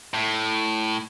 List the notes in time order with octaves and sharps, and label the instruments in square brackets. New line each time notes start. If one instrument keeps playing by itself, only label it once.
[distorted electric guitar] A2